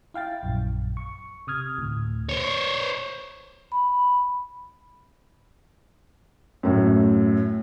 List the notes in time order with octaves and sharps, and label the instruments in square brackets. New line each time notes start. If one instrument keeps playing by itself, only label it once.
[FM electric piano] E4 F5 G5 A6
A#1 F#2
C#6
C3 D#6 F6 G#6
D2 A2
[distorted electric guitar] C5 C#5
[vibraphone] B5
[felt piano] F#2 A2